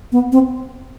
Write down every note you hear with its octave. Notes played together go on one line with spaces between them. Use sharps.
B3
C4